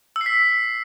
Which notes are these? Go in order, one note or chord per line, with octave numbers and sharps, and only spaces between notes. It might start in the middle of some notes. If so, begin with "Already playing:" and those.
E6
C7
B6